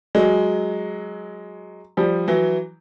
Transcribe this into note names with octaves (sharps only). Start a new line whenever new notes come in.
F#3 G#3
F3 G3
E3 F#3